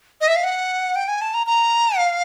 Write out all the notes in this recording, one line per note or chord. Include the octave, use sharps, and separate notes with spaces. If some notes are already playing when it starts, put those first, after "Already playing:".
D#5
E5
F5
F#5
G5
G#5
A5
A#5
A#5
F5